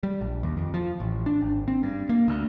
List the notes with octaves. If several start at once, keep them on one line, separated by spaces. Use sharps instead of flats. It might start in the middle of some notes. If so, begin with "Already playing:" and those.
G3
A#1
D#2
F2
F3
A1
D4
G#1
C4
G2
A#3
D2